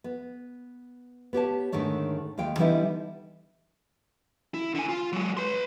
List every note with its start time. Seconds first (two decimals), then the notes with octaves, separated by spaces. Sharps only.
0.04 B3
1.33 B3 G4 C#5 A5
1.72 G#2 D3 D#3 A3 C#5
2.38 D#2 G#3 F5 G5
2.57 D3 E3 G3 B3 D#4 E4
4.54 E4
4.75 D3 G#5
4.88 F4
5.12 F#3 G#3
5.37 B4 C6